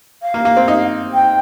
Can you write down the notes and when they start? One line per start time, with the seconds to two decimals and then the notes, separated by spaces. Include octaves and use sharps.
0.22 F5
0.34 A#3
0.45 A#3
0.57 C4
0.68 D#4
1.13 G5